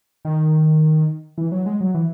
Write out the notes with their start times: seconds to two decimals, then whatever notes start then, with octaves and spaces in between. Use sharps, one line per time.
0.25 D#3
1.38 E3
1.52 F#3
1.66 G#3
1.80 F#3
1.94 E3